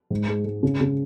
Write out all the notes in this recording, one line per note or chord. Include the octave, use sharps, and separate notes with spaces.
G#2
G#3
G#3
C#3
C#3